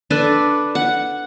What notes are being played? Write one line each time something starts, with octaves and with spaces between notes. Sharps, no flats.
D4 A4 B4 D5
F#5